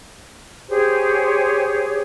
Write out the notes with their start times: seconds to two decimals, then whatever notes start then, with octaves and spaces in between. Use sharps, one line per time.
0.68 G4 G#4 C5 C#5